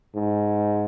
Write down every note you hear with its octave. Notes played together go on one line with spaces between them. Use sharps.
G#2